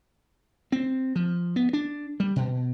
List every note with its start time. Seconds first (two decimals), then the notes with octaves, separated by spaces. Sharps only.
0.72 C4
1.16 F3
1.56 B3
1.73 D4
2.20 G3
2.36 B2